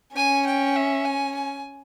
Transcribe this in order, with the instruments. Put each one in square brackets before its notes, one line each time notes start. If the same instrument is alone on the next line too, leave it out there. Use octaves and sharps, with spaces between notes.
[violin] C#4 [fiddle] G#5
[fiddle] G5
E5
G#5
G#5